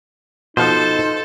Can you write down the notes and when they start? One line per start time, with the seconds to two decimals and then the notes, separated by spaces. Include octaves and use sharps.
0.57 B2 F3 D#4 A4 C5